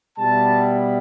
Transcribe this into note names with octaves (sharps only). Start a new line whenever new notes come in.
B2 G3 B3 E4 A5